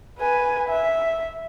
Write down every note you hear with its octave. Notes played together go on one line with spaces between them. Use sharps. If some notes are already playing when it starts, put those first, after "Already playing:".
B4 G#5
E5